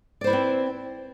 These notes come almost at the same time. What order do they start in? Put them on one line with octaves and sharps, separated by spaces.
D5 C5 E4 B4 C4